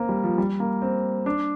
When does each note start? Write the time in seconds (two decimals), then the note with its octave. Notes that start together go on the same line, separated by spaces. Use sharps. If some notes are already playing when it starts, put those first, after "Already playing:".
Already playing: A#3 C4
0.09 G3
0.24 F3
0.38 G3
0.60 A#3
0.82 C4
1.26 D4